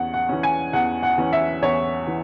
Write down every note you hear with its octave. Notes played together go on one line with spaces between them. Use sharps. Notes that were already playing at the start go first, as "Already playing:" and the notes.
Already playing: E2 C#4 F#5
F#5
E3 C#4
G#5
E2 F#5
F#5
E3 C#4
E5
E2 C#5
E3